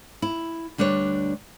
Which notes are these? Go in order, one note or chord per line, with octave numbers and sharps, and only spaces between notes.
E4
D2 G3 D4 B4 C#5